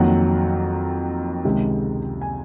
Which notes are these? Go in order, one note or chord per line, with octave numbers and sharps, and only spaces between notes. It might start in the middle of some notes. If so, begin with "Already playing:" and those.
Already playing: F2 D#3 F#3 A#3 F#5
C#2 C3 D#3 G#3
G#5